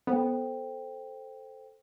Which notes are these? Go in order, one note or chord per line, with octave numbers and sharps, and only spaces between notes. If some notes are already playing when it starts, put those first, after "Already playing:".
B3 A4 C5 G5